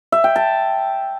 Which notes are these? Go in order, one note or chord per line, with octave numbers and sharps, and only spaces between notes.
E5
G5
A5